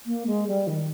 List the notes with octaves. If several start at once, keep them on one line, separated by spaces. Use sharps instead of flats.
A#3
G#3
G3
D#3